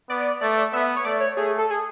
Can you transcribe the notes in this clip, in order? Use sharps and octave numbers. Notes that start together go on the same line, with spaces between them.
B3 D5
A3 D5
B3 E5
C#5
A3 D5
C#5
A3 G#4
A4
G#4